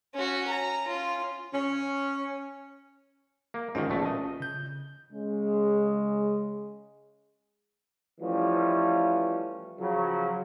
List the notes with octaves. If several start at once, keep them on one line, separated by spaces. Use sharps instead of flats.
C#4 F#4
A#5
C#4 F4
C#4
A#3
G#2 D#3 C#4 F4
A#1 B2 A3
D#5
C#3 G6
C#3 G#3
E3 F3 G3 A3 C#4
C#3 F3 F#3